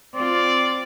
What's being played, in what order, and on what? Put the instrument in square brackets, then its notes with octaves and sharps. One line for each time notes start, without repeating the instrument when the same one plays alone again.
[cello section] C4 F4 [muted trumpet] D5